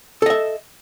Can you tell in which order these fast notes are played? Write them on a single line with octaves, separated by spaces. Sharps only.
A4 D#5 E5